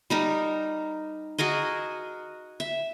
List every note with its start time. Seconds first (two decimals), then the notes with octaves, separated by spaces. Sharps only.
0.10 G3 D#4 A#4
1.38 F#4 G#4 A#4 D#5
2.60 E5